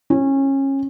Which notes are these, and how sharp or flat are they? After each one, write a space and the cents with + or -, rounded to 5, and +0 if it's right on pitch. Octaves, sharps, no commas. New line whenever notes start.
C#4 -25